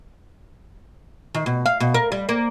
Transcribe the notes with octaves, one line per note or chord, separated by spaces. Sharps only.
D#3
B2
F5
B2
A#4
G3
A#3